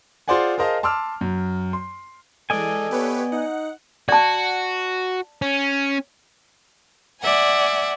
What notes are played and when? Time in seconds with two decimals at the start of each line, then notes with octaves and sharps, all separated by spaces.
0.28 F4 G#4 C5 D5 F#5 G#5
0.58 G#4 A#4 C5 D#5 F5 A5
0.83 A5 C6 D6 E6 F6
1.21 F#2
1.73 C6
2.50 E3 G#3 A4 D5 D#5 G#5
2.91 B3 G4 B4 C#5
3.32 D#4 F#5
4.09 F#4 D5 A5
5.42 C#4
7.21 D5 E5 F#5 G#5